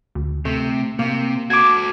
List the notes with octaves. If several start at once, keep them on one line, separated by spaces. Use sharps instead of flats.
D2
C3 A3
C3 A#3
F#4 A4 D6 G#6